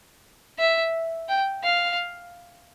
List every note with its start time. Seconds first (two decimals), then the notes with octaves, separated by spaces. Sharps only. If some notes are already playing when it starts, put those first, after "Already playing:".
0.59 E5
1.29 G5
1.64 F5